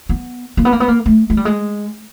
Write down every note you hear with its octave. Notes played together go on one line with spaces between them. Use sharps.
B3
A#3
B3
A#3
B3
A#3
A3
G#3
G3
G#3